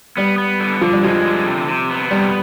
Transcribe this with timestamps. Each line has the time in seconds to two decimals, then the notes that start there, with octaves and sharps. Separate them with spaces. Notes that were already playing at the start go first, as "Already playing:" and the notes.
0.17 G3 B3
0.38 B3
0.60 D3
0.81 D3 F3
0.93 G3
1.03 F3 G#3
1.25 D3
1.46 C3
1.67 C3
1.90 B3
2.11 C3 G3